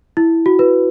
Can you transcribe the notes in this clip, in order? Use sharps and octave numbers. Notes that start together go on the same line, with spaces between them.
E4
F#4
B4